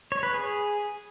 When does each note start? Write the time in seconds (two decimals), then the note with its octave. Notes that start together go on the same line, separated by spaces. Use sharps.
0.12 C#5
0.23 B4
0.34 G#4